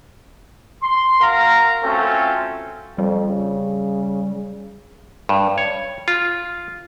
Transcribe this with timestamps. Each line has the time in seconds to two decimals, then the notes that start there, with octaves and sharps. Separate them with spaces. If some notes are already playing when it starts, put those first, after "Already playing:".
0.83 C6
1.21 F#4 A#4 F5 A#5
1.84 A3 C4 C#4 F4 F#4 A4
2.98 F2 G3
3.28 C#3
5.29 G2
5.58 C#5
6.08 F4